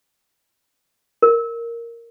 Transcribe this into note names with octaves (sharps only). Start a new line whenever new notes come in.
A#4